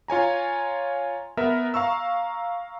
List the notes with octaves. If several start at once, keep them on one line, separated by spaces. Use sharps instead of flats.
F4 C#5 G#5 A#5
B3 A#4 E5
F5 A#5 C#6 E6